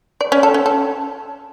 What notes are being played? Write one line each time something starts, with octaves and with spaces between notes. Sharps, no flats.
D5
C#4
A4
C#4
A4